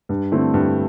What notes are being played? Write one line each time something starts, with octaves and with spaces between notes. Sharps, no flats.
G2
D3 A3 C4 E4
G2